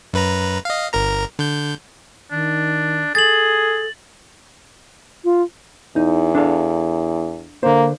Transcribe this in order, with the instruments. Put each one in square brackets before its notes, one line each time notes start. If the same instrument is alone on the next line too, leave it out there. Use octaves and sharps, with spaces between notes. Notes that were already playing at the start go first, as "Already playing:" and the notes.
[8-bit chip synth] F#2 B4 A#5
D#5 F5
G1 A#4 A#5
D3 G6
[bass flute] D#3 [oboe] D4
[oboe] G#4 [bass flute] A4 [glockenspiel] A6 F#7
[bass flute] F4
[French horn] E2 [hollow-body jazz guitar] D#4
[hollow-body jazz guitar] D4 A4 F5
[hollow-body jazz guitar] D3 C5 [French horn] A#3